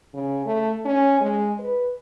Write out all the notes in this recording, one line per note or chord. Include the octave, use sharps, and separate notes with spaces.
C#3
A3
C#4
G#3
B4